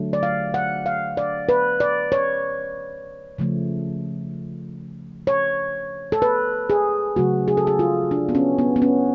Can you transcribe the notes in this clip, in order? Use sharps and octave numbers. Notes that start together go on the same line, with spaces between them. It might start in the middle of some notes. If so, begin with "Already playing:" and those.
Already playing: D3 F#3 A3
D5
F5
F#5
F5
D5
B4
D5
C#5
C#3 F3 A3
C#5
A4
B4
G#4
C#3 F#3 A3 F#4
G#4
A4
G#4
F4
D4
B3
C#4
B3
B3
C#4